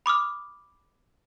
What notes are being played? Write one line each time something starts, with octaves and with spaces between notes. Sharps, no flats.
B5 D6 D#6 F6